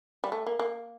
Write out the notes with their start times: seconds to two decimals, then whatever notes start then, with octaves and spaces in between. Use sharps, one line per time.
0.24 G3
0.32 A3
0.46 A#3
0.59 A#3